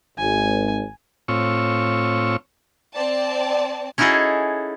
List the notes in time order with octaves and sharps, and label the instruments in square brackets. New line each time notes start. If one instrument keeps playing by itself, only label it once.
[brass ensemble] G#1 [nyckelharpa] G#5
[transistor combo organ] A2 C4 F4 C#5 C#6 E6
[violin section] C4 D5 A5
[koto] C#4 D#4 E4 F#4 G#4 A4